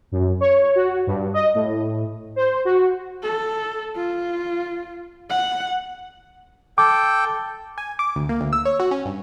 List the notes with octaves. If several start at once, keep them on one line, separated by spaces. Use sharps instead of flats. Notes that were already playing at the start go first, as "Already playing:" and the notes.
F#2
C#5
F#4
G2
D#5
A2
C5
F#4
A4
F4
F#5
A4 G5 D6
G#5
D6
D2
A#3
D2
E6
C#5
F#4
C#4
G2